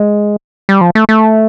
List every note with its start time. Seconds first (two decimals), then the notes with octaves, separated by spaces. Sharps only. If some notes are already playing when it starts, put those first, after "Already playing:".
Already playing: G#3
0.69 G3
0.81 F3
0.95 A3
1.09 A3